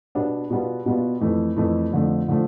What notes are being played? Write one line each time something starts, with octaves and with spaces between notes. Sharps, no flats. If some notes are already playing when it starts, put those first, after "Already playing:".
B2 G3 B3 D4
B2 G3 B3 F4
B2 G3 B3 F4
F2 E3 A3
F2 E3 A3
F2 D3 F3 A3
D3 F3 A3